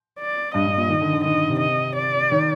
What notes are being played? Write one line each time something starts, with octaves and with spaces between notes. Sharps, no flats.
D5
G2 D#5
G2
A#2
D#3
D3
D3
D#3 D#5
C3
D#5
D5
D#3